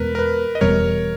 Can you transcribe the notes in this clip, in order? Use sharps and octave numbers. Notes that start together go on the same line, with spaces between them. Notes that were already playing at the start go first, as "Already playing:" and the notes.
Already playing: E2 B2 G#3 B3 A#4 B4
A#4
B4
D#5
E1 E2 B2 G3 A#4 C#5